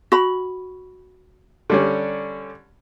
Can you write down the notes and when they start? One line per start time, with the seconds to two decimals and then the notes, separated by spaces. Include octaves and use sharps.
0.12 F#4 B5
1.70 D3 G3 C#4